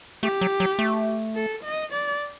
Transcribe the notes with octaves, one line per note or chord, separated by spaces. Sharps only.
A3 G4
F#3
F#3
A3
A4
D#5
D5